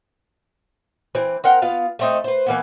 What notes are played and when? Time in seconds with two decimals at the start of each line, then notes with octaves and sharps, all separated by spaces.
1.15 E3 C4
1.44 C4 A#4 F#5 G5
1.62 B3 F4 F5
1.99 A3 C4 D#4
2.24 B4 C5
2.46 E3 A#3 B3